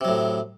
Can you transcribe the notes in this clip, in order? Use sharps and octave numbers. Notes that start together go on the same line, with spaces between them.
A2 C3 F#3